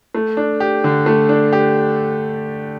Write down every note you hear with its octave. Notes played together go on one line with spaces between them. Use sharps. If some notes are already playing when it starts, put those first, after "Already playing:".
A3
D4
G4
D3
A3
D4
G4